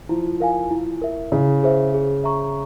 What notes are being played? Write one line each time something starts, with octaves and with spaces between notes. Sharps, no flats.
F3 E4
A#4 F5 G#5
E4
A#4 E5
C#3 E4
G#4 C5 E5
G#4
E5 A#5 C#6